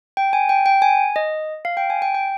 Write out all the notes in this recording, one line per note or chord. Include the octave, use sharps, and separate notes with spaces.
G5
G#5
G5
G5
G#5
D#5
F5
G5
G#5
G5
G5